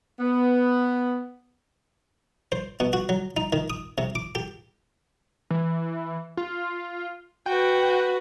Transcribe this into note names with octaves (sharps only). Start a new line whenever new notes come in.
B3
C5
B2
F#4
F#3
D#4
D#3
D#6
C3
D6
G4
E3
F4
F#4 B4 G5